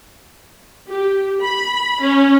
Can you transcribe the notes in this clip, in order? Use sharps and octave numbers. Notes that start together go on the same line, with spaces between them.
G4
B5
C#4